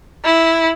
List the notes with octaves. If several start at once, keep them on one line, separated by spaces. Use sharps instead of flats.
E4